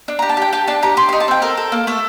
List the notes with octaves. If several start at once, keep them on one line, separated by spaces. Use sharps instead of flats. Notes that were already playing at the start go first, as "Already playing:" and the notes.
D4
A#5
G4
A5
G4 G5
G4 A5
D4 A5
G4 A#5
G4 C6
C6
D#4
A5
C4 G5
A4 A#4
A4
A#3
A3 A4